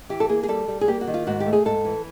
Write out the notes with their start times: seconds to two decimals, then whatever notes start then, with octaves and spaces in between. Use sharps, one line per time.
0.09 E3 G4
0.20 A4
0.29 A#3 G#4
0.43 G#4
0.48 G3 A4
0.68 G3
0.81 G#4
0.88 A#3 G4
1.01 F#4
1.07 D#3
1.14 F4
1.27 G#2 F#4
1.40 G4
1.46 A3
1.53 G#4
1.65 G#2 A4
1.85 E3